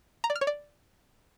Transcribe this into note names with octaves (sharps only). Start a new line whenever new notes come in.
A#5
D5
F6
C#5
D5